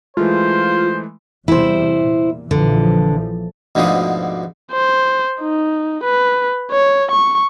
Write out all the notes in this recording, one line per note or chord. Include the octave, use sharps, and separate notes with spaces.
E3 G#3 A3 F4 C5
E2 C3 G3 E4 C5
A#2
A#1 D3 E3 F3
D2 G#2 B2 D3 F3 D#6
C5
D#4
B4
C#5
C#6